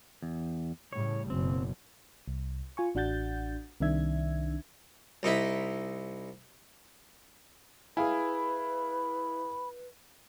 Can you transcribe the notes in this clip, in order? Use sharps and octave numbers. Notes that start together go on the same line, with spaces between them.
E2
A2 C#3 G3 C#5
F#1 F#2 B2 C4
C2
F4 G#5 C#6
A1 D4 F#4 F#5 G6 A6
C2 C3 D#3 D4 E5 G#6
C2 D#4 E4 B5
E4 G#4 B4 F5 G#5 B5